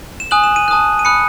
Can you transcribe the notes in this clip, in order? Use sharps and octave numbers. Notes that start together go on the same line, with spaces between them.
E7
G#5 D#6 F#6 F#7
E7
D#7
A5 D#6 F#6
D#7
B5 D#6 F#6 C#7